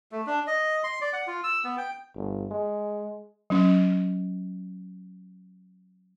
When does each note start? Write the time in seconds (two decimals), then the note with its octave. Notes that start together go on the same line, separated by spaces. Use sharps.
0.12 A3
0.27 D4
0.47 D#5
0.84 C6
1.01 D5
1.13 F#5
1.27 F4
1.44 E6
1.64 B3
1.78 G5
2.15 G1
2.51 G#3
3.50 F#3 C#4